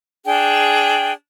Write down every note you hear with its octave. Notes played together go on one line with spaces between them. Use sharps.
D4 G#4 G5